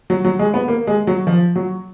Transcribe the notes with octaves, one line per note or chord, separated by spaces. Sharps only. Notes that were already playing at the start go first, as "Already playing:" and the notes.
F#3
F#3
G#3
B3
A#3
G#3
F#3
F3
F#3